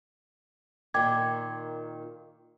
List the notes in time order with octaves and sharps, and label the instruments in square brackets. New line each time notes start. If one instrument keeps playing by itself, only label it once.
[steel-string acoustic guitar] A#2 D#3 [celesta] G5 D6 G#6